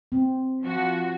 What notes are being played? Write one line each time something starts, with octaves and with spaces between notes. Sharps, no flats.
C4
F3 F#4